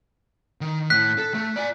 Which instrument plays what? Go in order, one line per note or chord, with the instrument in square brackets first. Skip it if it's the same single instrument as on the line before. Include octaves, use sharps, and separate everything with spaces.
[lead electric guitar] D#3
[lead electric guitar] A2 [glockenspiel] F#6 B6
[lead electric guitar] A4
A3
D5 G#5